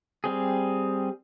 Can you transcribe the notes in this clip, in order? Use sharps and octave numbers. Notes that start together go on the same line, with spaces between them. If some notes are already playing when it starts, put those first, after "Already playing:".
G3 C4 G#4